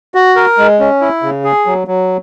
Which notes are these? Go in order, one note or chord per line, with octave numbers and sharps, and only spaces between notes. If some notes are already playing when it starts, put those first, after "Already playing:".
F#4
A#4
G#3
C#4
E4
C#3
G#4
F#3
F#3